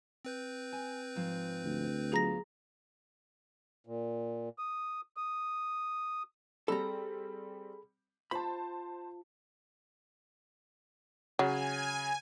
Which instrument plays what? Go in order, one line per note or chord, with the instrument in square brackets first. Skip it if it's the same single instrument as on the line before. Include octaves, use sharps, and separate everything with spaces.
[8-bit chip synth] C4 B4 G6
[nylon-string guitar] G#5
G#2 F3
[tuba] D2
[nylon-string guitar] F#3 B3 F4 [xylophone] G#4 A#5 A#6
[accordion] A#2
D#6
D#6
[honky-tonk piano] G3 C4 [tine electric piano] G#4 B5 [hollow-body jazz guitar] A4 A#5
[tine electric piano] F4 [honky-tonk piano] C5 A5 [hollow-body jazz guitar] B5
[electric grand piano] C#3 [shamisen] F#3 [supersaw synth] G#5